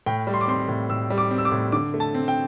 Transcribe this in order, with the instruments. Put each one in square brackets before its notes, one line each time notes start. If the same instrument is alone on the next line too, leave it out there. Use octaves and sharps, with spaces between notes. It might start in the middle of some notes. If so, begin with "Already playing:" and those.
[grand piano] A2 G5
G3
C6
D6
C4 C6
A2
A2 E6
G3
D6
C4
E6
D6
A2
D3 D6
A3
A5
C4
G5